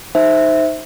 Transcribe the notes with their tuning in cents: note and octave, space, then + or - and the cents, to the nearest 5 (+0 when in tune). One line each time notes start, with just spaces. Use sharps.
D#4 +0 C5 +0 E5 -10